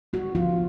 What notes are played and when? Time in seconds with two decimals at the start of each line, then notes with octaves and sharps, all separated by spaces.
0.13 B3 F#4
0.35 F3 F4